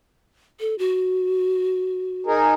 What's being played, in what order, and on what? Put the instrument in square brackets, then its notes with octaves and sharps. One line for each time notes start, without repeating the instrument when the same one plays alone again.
[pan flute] A4
F#4
[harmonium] D#4 G#4 A#4